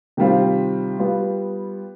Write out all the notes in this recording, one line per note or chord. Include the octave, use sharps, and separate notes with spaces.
C3 D#3 G3 C4 F4
G3 B3 F4